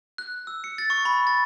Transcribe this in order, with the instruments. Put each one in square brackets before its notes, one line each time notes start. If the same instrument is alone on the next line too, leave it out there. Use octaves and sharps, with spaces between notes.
[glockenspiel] F#6
E6
C#7
A6
C#6
B5
A6